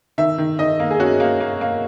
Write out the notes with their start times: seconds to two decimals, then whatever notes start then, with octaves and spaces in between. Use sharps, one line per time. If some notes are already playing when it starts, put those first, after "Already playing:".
0.18 D#3 E5
0.38 D#3
0.59 D#3 D#5
0.80 A#3
0.91 G#4
1.00 C#4 F#4
1.20 A#3
1.40 A#3
1.61 A#3